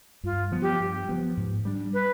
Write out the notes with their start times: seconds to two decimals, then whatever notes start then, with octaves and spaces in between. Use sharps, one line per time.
0.24 G2 F4
0.52 F3 B3
0.62 G4
0.80 G2
1.09 F3 B3
1.37 G#2
1.65 G3 D4
1.93 B4